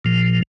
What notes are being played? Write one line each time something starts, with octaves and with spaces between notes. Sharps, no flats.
A#2 F3